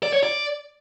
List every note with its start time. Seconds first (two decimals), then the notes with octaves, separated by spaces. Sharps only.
0.03 D5
0.13 C#5
0.23 D5